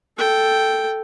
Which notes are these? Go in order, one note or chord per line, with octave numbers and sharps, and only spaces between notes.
A4 G5